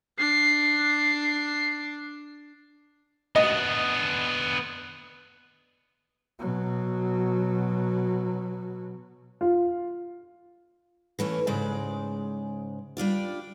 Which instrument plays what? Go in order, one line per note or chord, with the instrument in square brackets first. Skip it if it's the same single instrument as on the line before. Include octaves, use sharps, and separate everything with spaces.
[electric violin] D4 [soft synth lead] C7
[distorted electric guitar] B3 D4 [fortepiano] D#5
[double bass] B2 F#3
[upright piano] F4
[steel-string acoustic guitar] E3 A3 C#4
G#2 C#3 G#3 D5
G3 D4 F4 D5